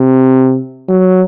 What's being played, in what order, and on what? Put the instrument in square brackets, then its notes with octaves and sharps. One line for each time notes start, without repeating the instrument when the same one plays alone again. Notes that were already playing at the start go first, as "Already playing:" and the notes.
Already playing: [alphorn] C3
F#3